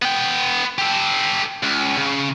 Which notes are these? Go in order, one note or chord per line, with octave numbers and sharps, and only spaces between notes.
B3 G5
G4 A4
C#2
C#3